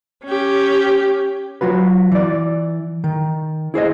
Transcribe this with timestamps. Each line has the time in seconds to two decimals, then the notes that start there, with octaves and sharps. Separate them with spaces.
0.24 C#4 G4
1.61 F#3 F4 F#4 B4
2.12 E3 D5
3.04 D#3
3.74 E4 G#4 C5 D#5